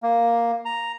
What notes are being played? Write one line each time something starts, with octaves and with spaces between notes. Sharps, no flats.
A#3
A#5